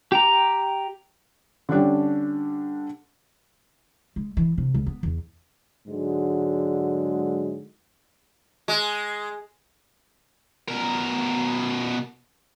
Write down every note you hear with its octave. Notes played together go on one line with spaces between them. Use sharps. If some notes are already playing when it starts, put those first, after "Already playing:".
G4 G5 A#5
D3 G3 C#4 D4 G4
G#3
E3
C3
C#2
B3
E2
G#2 D3 F#3 G#3
G#3
B2 A#4